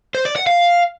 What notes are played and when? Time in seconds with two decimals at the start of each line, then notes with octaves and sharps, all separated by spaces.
0.15 C5
0.25 D5
0.36 F#5
0.46 F5